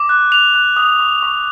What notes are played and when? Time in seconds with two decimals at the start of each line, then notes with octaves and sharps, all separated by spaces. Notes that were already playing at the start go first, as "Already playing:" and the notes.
Already playing: D6
0.09 F#6
0.31 F#6 F7
0.54 F#6
0.76 D#6
1.00 C#6
1.23 C#6